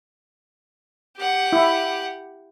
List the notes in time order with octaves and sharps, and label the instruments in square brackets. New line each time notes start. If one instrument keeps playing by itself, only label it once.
[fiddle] G4 F#5
[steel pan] E4